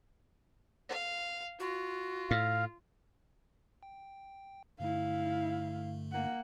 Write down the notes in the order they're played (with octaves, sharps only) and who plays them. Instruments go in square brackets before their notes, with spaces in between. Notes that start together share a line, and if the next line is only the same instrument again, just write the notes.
[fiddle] F5
[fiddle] F4 [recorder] F#4
[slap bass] A2 [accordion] F5
[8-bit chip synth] G5
[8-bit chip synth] G2 D3 A3 [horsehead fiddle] E4 F5
[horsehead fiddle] A#3 F#5